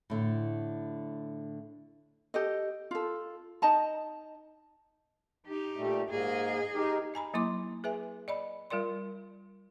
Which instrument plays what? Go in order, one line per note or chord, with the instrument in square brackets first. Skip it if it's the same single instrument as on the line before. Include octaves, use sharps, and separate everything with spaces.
[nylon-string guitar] A2 D3
[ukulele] G4 A4 D#5
F4 A4
D#4 D#5 A5 A#5
[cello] D#4 G4
[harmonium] A#2 G3 A3
[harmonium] G#2 A#3 [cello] G#4 D#5
[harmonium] D#4 G4 A#4
[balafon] D#5 G#5 A#5 B5
F#3 A#3 E4 C6 D6
G#4 B4 E5 G#5
D5 D#5 B5
G3 F4 A#4 D5 C6